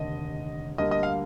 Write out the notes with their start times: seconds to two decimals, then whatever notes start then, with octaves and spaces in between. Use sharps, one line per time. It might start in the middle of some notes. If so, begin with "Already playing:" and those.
Already playing: F1 D#2 D3 D#5
0.78 D2 D3 G3 A#3 D#5
0.91 D#5
1.03 F5